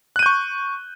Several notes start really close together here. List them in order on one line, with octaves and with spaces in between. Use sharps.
F#6 D#7 G6 C#6